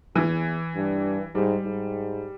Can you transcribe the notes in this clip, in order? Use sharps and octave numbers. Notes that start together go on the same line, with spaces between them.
E2 E3
G2
G#2 G3
G#2